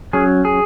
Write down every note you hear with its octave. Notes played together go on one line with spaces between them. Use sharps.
F#3 C#4 G#4
G#4